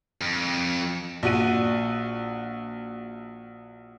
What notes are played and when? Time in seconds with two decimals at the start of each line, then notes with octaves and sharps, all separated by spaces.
0.21 F2
1.23 A#1 F#4 D#7